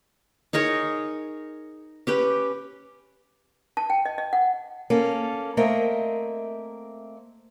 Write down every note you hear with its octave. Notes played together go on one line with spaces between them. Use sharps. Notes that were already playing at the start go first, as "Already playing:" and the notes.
D#4 G#4 A#4 C#5
C#4 G4 B4
A5
G5
D#5
D#5
F#5
A#3 C#4 A4
A3 A#3 C4 A#4 D#5 E5